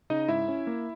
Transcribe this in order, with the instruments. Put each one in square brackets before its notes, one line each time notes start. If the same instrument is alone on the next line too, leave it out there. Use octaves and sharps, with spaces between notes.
[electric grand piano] C#3 D#4 D#5
G#2 E4 E5
C#4
A#3